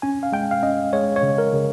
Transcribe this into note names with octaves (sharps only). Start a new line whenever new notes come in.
C#4 G#5
F5
G#3 G5
F5
C#4 D#5
G#3 C#5
C#5
C#3
A#4
C#3